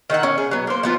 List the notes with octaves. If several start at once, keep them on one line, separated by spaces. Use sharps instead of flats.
D#3 D#4 E5 F#5
C#4
G#4
F#3 B3
A#3 C5
F3 B3 F4